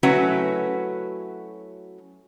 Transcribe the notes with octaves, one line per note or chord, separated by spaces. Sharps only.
F#3 A3 C#4 E4 F#4 B4